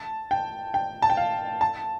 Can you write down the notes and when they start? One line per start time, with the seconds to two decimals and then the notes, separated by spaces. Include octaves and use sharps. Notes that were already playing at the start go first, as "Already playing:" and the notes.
Already playing: A5
0.31 G5
0.74 G5
1.02 A5
1.10 G5
1.17 F5
1.61 A5